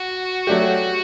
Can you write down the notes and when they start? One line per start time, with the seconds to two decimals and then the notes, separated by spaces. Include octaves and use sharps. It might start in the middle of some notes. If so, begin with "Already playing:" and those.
Already playing: F#4
0.47 F#3 A3 D4 G4